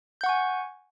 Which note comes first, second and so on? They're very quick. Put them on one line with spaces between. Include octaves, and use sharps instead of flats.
G6 F#5 C#6 G#5